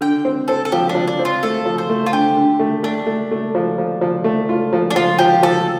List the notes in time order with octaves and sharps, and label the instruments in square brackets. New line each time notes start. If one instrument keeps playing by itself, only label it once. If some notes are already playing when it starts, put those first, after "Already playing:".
[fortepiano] D3 [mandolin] G5
[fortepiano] C4
[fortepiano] C4 [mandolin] A4
[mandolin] A4
[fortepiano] F3 [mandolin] G4
[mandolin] D4
[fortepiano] F3
[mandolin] D4
[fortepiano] C4
[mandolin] F4
[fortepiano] A3 [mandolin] A4
[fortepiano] F3
[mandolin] C5
[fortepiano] A3
[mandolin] F4
[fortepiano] D3 [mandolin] G4
[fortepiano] D3
A3
[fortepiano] A3 [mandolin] D4
[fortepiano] A3
A3
F3
F3
F3
A3
F4
F3
[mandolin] D4
[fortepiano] F3 [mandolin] F4
[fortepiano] F3 [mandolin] G4
[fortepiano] F3 [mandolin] A4